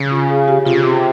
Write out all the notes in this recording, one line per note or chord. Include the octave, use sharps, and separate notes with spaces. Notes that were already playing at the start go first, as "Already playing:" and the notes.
Already playing: C#3
F4
G#4
G4
C3 F4
C#3
C3